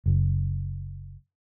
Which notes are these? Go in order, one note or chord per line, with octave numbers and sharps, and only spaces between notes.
F#1